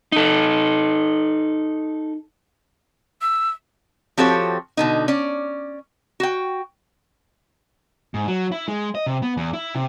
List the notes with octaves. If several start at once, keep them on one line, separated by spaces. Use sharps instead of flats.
D#4 A4
E6
F3 C4 F#4 G4 A4 C#5
B2 D3 D#4
C#4 D5
F#4 G5
G#2
F#3
E4
G#3
D#5
C3
B3
E2
E4
C3